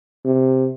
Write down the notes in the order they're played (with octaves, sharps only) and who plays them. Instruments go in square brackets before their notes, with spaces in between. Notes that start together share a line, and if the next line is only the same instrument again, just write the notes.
[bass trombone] C3